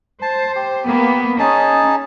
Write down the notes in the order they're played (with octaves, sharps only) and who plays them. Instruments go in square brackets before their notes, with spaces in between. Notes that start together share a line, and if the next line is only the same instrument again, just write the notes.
[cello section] C5 [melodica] A5
[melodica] G4
[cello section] A#3 B3
[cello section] C#4 [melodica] D#4 G#4 A5